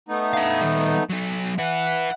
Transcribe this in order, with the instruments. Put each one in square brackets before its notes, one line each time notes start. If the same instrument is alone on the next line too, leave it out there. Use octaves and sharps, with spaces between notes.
[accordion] A3 B3 D#4
[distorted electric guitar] B4 F5
D#3 G3
F#3 D#4
[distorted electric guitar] E4 B4 [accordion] F#5